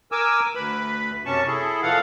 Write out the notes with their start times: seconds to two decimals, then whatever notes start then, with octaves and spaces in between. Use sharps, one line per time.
0.12 A#4 G#5 D6 E6
0.55 D2 B4 B5
1.25 F#2 C3 C#4 A5 C#6
1.47 E4 G#4 A4
1.82 A#2 E3 F3 A4 F5 F#5